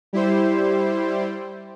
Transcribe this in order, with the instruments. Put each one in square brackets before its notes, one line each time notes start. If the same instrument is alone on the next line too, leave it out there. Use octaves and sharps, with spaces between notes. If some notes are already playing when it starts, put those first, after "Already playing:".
[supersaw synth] G3 E4 G4 C5